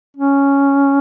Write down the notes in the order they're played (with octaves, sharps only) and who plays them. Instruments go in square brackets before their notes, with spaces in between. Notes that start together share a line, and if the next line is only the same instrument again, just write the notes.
[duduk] C#4